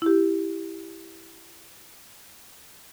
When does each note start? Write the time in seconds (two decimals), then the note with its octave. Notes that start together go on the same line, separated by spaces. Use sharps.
0.02 E4 G4